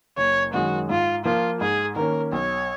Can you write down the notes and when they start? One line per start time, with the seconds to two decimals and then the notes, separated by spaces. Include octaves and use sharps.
0.18 F#1 C#5
0.54 F#2 D#3 G#3 F#4
0.89 G#2 F4
1.25 F3 A#3 F4
1.61 G#2 G#4
1.96 D#3 A#3 C#4 A#4
2.32 B1 C#5